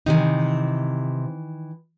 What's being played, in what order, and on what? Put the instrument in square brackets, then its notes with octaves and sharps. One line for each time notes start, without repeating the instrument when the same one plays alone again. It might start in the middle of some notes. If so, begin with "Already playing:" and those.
[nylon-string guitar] C3 D#4 [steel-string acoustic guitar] D#3 E3